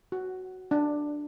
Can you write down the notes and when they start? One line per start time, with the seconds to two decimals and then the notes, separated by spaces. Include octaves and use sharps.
0.12 F#4
0.71 D4